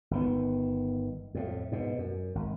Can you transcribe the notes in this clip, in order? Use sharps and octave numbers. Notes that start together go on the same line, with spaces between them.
G1 D#3 B3
F2 A2
G#2 B2
F#2
G#1